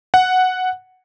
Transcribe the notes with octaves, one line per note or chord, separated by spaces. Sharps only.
F#5